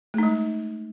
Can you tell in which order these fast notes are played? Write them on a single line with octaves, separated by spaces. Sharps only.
A3 D#4 G#3